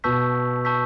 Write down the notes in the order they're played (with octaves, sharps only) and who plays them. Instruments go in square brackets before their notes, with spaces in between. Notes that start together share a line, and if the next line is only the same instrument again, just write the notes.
[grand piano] B2 [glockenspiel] A5 C#6 E6 G6 B6
[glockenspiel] A5 C#6 E6 G6 B6